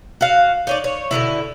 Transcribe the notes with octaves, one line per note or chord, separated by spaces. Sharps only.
F#4 F5
D#4 C#5 D5
C#5
B2 D3 E3 E4